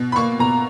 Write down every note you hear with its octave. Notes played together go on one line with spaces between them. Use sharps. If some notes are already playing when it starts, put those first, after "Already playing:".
Already playing: B2
B5
A#3 C#6
B2 A#5